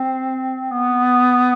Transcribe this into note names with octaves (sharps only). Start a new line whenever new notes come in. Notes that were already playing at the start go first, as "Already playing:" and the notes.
Already playing: C4
B3